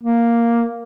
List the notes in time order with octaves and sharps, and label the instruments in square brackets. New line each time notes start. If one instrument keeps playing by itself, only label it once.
[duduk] A#3